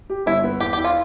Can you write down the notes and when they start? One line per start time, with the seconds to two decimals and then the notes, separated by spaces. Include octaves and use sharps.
0.10 G4
0.26 G1 E4
0.44 B3
0.60 E2 G4
0.73 G4
0.78 E4
0.84 F4